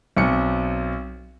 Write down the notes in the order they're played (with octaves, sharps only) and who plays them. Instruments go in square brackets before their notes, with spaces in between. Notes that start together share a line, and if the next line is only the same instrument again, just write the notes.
[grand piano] B1 C4 C#7